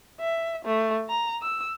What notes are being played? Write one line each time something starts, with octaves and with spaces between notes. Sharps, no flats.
E5
A3
A#5
E6